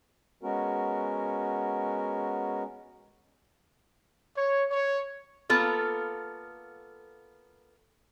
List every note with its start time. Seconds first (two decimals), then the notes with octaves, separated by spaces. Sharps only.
0.43 G#3 B3 C#4 F#4 A#4
4.36 C#5
4.71 C#5
5.49 A#3 B3 F4 A4